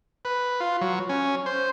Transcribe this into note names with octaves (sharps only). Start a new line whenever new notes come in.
B4
F4
F#3
C#4
C5